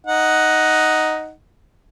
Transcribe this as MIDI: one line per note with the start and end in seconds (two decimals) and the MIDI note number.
0.07 1.31 63
0.07 1.31 78